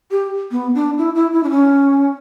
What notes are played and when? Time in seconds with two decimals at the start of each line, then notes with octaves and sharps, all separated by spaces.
0.11 G4
0.51 B3
0.75 D4
0.98 E4
1.15 E4
1.32 E4
1.43 D4
1.50 C#4